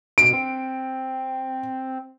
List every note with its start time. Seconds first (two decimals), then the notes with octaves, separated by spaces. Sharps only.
0.18 B2 D7
0.33 C4